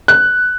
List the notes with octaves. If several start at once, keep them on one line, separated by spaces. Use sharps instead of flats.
F#6